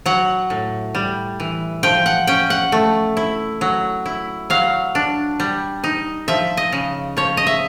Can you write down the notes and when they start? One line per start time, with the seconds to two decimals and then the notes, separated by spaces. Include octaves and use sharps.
0.06 F#3 F#5
0.50 A2
0.95 G3
1.40 E3
1.83 F3 G5
2.06 F#5
2.27 C#4 G5
2.50 F#5
2.72 A3
3.17 E4
3.61 F#3
4.06 E4
4.50 F#3 F5
4.95 D4
5.40 G3
5.84 D#4
6.28 F3 E5
6.57 D#5
6.72 C#3
7.17 F3 C#5
7.37 D#5
7.47 E5